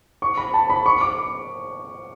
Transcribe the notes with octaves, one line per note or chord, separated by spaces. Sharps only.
C#6
B5
A5
B5
C#6
D6